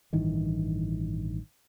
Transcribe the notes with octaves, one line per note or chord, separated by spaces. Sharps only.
A1 G2 D#3 E3